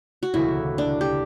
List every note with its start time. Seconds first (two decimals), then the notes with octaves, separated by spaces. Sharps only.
0.23 F#4
0.33 E1 D2 C#3 G3 A#3 E4
0.78 D4
1.01 G4